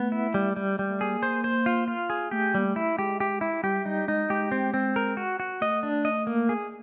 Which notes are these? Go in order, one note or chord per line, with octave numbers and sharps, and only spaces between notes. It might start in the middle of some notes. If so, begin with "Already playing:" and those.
Already playing: A3 B3
E4
G3
G3
G3
A3
A#3 G#4
C5
C5
F4
F4
G#4
A3 G4
G3 A#3
A3
E4
G#3 G4
G4
E4
G3 G4
G3 D#4
G#3 D#4
G#3 G4
C4
C4
A#4
F#4
F#4
A3 D#5
D4
D#5
A#3
G#4